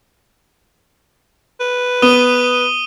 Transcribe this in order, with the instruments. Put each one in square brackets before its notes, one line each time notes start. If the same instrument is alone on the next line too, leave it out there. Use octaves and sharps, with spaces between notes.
[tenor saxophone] B4
[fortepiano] B3 [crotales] D#6 D#7 G7